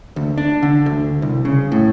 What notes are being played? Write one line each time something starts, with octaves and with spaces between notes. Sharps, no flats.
D2
D4
D3
D2
C2
C#3
A2